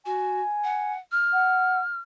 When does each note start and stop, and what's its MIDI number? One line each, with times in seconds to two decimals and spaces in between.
0.06 0.41 66
0.06 0.93 80
0.64 0.98 78
1.12 2.00 89
1.33 1.80 78